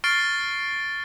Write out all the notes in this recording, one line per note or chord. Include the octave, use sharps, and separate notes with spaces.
C#6 F6 A6 C7 D7 G7